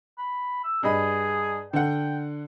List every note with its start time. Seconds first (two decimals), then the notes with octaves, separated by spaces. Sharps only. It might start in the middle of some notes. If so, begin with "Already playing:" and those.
0.18 B5
0.64 E6
0.83 G2 G#4 D#5 B5
1.73 D3 F#5 G5